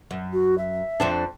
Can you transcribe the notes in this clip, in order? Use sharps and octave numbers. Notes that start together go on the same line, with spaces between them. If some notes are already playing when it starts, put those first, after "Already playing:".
F#2
F#4
E5
F2 C4 D4